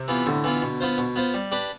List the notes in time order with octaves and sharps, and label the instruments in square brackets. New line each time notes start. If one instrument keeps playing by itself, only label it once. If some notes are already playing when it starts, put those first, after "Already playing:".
Already playing: [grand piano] C3
[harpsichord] E3 B3 F4
[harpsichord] A2 [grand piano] D3
[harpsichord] E3 B3 F4
B2
B3 F4 C5
B2
B3 F4 C5
G3
D4 G4 B4